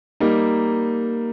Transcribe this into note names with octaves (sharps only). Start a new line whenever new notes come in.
G3 A#3 D#4